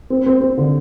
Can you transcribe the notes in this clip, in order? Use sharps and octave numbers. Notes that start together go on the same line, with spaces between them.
C4
C4
C4
D3